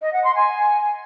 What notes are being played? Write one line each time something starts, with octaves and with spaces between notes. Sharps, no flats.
D#5
F#5
C6
G#5